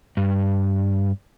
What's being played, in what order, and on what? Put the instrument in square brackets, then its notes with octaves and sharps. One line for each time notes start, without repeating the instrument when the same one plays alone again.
[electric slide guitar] G2